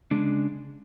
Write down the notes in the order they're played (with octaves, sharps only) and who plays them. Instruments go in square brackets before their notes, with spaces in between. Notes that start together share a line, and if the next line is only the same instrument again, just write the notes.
[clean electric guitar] C#3 G#3 D4